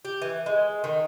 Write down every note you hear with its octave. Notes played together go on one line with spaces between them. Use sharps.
G4
E3
G#3
D#3